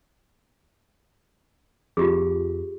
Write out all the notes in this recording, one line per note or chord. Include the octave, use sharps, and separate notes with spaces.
F2 F4 G4 G#4